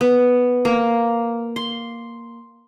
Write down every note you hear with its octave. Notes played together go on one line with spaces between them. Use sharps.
B3
A#3
C6